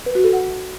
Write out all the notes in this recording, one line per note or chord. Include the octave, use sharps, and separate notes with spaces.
B4
F#4
A4
F#5